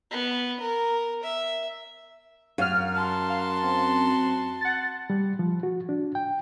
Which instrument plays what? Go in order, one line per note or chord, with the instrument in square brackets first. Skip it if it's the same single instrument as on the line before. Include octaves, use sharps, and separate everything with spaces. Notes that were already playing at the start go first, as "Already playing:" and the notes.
[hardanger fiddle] B3
A#4
E5
[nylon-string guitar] F#2 [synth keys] F5 F6
[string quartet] F#4 A5 C6
[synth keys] F5
C4
F#5 A6
[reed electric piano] G3
F3
F#4
D4
G5